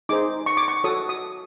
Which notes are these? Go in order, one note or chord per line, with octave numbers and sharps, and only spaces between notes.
D#4 G#4 C5 D6
C#6
D6
C#6
F#4 A4 C#5 D#6
D#6